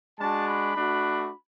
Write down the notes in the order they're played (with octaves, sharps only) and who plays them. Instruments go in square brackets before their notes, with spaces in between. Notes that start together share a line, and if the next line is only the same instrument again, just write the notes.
[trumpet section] G#3 D4 F#4 A5
B5
A3 D4 F#4